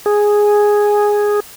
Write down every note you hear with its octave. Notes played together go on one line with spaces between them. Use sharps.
G#4